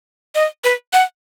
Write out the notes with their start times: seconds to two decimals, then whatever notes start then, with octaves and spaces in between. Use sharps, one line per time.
0.35 D#5
0.64 B4
0.93 F#5